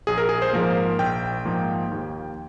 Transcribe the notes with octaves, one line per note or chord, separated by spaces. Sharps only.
A#1 G#4
A#4
G#4
C5
G#2 F3 A#3 A#4
A#1 G5
G#2 F3 A#3
D#2